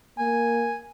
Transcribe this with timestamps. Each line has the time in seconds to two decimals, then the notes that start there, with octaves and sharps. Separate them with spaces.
0.18 A#3 G#5